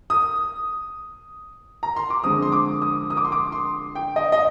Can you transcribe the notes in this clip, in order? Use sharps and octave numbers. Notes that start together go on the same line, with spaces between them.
D#6
A#5
C6
D6
D3 F3 G#3 C4 D#6
C6
D6
D#6
D#6
D6
C6
D6
C6
G5
D#5
D#5